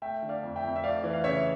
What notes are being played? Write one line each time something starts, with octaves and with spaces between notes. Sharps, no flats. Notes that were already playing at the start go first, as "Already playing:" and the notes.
A3 E5 G5
D3
D5 F5
F2
E5 G5
F2
E5
A3 D5 F5
E3
F5
C#3 C#5 E5